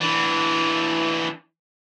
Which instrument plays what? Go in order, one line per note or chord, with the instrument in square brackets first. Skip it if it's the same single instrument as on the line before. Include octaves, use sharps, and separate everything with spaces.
[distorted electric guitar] E3 D4